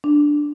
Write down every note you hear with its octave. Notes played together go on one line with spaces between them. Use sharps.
D4